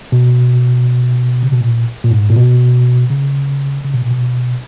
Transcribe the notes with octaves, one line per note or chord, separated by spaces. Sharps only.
B2
C#3
B2
A#2
A#2
G#2
A#2
B2
C#3
C#3
B2
A#2
B2